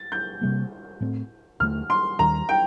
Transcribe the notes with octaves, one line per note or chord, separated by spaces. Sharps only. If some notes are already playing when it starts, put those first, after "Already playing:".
Already playing: A6
G6
C3 G3 A#3
A2 A3 C4
D#2 D3 F3 A3 F6
C6
D#2 D#3 G3 D4 A#5
G5